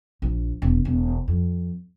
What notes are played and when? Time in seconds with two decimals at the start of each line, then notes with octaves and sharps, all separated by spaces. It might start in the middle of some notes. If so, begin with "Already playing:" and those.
0.22 A#1
0.62 E1
0.85 E1
1.28 F2